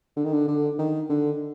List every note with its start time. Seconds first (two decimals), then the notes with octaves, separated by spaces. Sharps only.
0.17 D3
0.25 D#3
0.33 D3
0.48 D3
0.78 D#3
1.09 D3